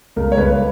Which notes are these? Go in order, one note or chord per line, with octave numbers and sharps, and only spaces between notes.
C#2 A#4
C#5
C#2 B4